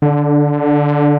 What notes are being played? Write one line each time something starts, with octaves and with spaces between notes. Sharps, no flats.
D3